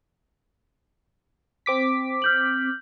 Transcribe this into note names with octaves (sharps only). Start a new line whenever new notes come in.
C4 D6 B6
F6 G6 F#7